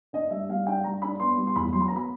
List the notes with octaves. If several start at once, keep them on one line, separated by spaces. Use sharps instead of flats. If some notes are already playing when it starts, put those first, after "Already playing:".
D4 D#5
G3 E5
G3 F5
D4 G5
G3 A#5
D4 B5
B3 C6
G3
C6
E2 B5
F#3 C6
B5
A#5
B3
B5